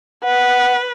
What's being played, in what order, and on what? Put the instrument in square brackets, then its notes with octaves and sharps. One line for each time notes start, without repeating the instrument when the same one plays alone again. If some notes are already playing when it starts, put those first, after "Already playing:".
[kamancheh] B4 [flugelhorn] F#5